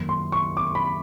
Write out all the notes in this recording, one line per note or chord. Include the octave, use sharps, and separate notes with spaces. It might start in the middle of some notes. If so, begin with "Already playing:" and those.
Already playing: F#2 D#3 F#3 A#3
C6
C#6
D6
B5